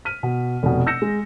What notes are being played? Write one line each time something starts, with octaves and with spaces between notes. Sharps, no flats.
F6 B6 D#7
B2
F1 B2
E6 G6 A#6 C#7 E7
G#3